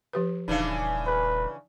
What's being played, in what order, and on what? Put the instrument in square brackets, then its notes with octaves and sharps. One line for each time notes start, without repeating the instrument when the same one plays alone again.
[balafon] F3 G4 B4
[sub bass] D#1 [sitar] C#3 E3 D4 [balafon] D#4 F5
[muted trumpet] B4